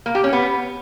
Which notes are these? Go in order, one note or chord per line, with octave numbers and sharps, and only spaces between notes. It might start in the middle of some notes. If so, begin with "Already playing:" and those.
A#3
G4
C#4
B3